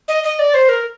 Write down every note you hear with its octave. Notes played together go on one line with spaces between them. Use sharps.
D#5
D#5
D5
C5
A#4